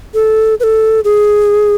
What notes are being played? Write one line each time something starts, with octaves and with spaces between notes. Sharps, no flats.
A4
B4
A4
G#4